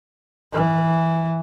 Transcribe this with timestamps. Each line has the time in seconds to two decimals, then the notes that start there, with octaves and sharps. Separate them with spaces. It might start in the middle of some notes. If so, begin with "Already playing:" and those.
0.53 E3